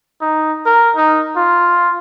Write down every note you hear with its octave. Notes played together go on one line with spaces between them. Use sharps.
D#4
A#4
D#4
F4